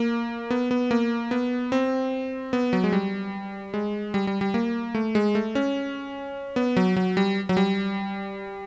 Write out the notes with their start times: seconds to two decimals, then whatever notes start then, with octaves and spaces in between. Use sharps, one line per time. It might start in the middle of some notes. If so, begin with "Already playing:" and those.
Already playing: A#3
0.50 B3
0.71 B3
0.91 A#3
1.31 B3
1.72 C4
2.53 B3
2.73 F#3
2.84 G#3
2.92 G3
3.74 G#3
4.14 G3
4.27 G3
4.41 G3
4.54 A#3
4.95 A3
5.15 G#3
5.35 A3
5.55 C#4
6.56 B3
6.77 F#3
6.96 F#3
7.17 G3
7.49 F#3
7.57 G3